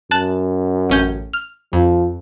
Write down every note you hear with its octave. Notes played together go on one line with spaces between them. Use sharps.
F#2 A5 F#6
A1 C#4 G6
F6
F2 F3